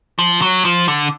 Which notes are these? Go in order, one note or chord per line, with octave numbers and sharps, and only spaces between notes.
F3
F#3
F3
D3